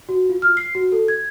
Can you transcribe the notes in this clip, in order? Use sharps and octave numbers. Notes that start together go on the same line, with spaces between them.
F#4
F4
F6
C7
F#4
A4
G#6